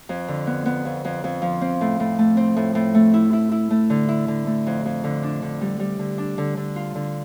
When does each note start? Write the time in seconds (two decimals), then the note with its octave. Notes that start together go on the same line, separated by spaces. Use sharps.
0.09 F2
0.28 D3
0.47 B3
0.66 B3
0.85 F2
1.05 F2
1.24 F2
1.42 F3
1.61 C4
1.81 A2
2.00 A2
2.18 A3
2.37 C4
2.56 A2
2.75 A2
2.95 A3
3.14 E4
3.33 E4
3.52 E4
3.70 A3
3.90 D3
4.08 E4
4.28 D3
4.46 A3
4.67 F2
4.85 F2
5.04 D3
5.23 D4
5.42 D3
5.61 G3
5.80 G3
5.99 D3
6.18 D4
6.38 D3
6.57 D3
6.76 F4
6.95 D3